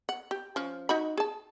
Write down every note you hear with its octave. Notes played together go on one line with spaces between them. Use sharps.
F#5
G4
F3 C#4
D#4 F#4 B5
G#4 A5